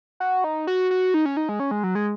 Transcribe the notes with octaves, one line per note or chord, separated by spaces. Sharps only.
F#4
D#4
F#4
F#4
D#4
C#4
D#4
G#3
C#4
G#3
F#3
G#3